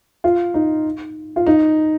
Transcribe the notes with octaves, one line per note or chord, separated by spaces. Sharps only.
F4
D#4
F4
D#4